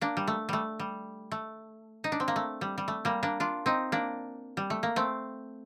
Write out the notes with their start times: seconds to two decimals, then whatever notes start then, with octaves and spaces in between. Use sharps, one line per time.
0.01 A#3 D4
0.17 G3
0.28 A3
0.49 G3 A3
0.80 G3
1.32 A3
2.04 D#4
2.12 D4
2.20 C4
2.28 A#3
2.36 A3
2.61 G3
2.78 G3
2.88 A3
3.05 G3 A#3
3.23 A#3 D4
3.40 D4 F4
3.66 C4 D#4
3.92 A#3 D4
4.57 G3
4.70 A3
4.83 A#3
4.96 A3 C4